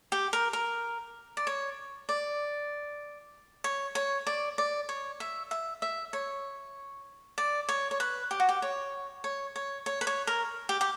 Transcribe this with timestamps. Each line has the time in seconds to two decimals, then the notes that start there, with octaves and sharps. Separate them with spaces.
0.12 G4
0.33 A#4
0.53 A#4
1.37 D5
1.47 C#5
2.09 D5
3.64 C#5
3.95 C#5
4.27 D5
4.58 D5
4.89 C#5
5.20 E5
5.51 E5
5.82 E5
6.13 C#5
7.38 D5
7.69 C#5
7.91 C#5
8.00 B4
8.31 G4
8.40 F#4
8.49 G4
8.62 C#5
9.24 C#5
9.56 C#5
9.86 C#5
10.01 B4
10.07 C#5
10.27 A#4
10.69 G4
10.81 G4